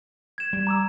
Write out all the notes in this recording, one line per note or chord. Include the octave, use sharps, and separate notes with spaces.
G#6 E7
G3
A#5 D6 E6